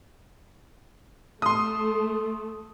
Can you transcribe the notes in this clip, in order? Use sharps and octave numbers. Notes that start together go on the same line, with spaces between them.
A3 C6 D#6